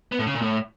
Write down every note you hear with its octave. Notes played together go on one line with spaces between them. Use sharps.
B3
A2
C#3
A#2
A2